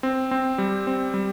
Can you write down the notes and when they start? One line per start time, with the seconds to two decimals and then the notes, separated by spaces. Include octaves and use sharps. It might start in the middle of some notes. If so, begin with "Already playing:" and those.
0.03 C4
0.31 C4
0.58 G3
0.87 C4
1.14 G3